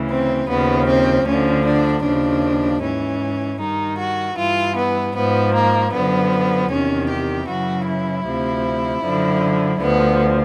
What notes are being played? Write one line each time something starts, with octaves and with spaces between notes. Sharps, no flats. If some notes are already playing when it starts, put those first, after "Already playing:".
Already playing: D2 C#3 E3
C4
D#2 C#3 F3 B3
C4
D2 D3 F3 C#4
D4
D#2 C#3 F3 D4
G#2 E3 C#4
G2 D#3 D#4
F#4
G2 E3 F4
B3
G#2 F3 B3
A#3
F#2 D3 F3 B3
E2 C3 D#3 C#4
G4
F#2 C#3 E3 F#4
E4
D2 C3 F3
F#2 D3 F3
D2 D3 F3 B3